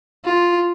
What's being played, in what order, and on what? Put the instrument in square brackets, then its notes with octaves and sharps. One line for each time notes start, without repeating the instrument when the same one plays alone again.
[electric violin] F4